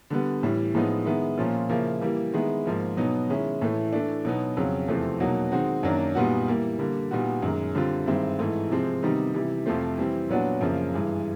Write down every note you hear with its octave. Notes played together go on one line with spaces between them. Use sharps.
D3 G3 B3
A2 E3 G3
A2 F3 G#3 B3 D#4
D#3 G#3 B3 E4
A#2 F3 A#3 C#4 F4
C#3 F3 A#3 C#4 E4
E3 G3 A#3
D#3 G#3 B3 E4
G#2 F3 A#3
B2 F#3 B3 D#4
D#3 G#3 C#4 E4
A2 E3 A3
E3 A3 D4
B2 F#3 B3 D#4
F2 C#3 F#3
E2 C3 F3 A3 C4
B2 F#3 A#3 D#4 F#4
D#3 G#3 C4 D#4 F#4
F#2 D#3 F#3 A#3 D4
A#2 G3 B3 D#4 F#4
E3 G3 A#3
D3 G3 A#3
A#2 G3 B3 D#4 F#4
F#2 D#3 G#3
D3 G3 C4 F4
G2 D#3 G#3 C4 E4
G#2 E3 A3
C3 F3 G#3 C4
C3 D#3 G3 B3 D#4
C3 E3 G3
F2 C3 F3 A3 C4
E3 G3 C4
A#2 F#3 B3 D4 F#4
F#2 C#3 F3 A#3
G2 E3 G#3